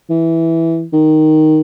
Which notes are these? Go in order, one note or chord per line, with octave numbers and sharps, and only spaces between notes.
E3
D#3